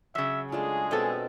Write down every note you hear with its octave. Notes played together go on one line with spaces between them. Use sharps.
C#3 F#3 E5
G#3 A3 D4 F4 G#4
B2 C4 A4 C#5 D#5